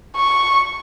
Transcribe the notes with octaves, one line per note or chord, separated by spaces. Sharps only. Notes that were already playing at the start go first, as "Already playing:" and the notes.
C#6